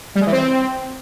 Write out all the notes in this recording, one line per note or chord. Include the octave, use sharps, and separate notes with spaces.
G3
G#3
E3
C4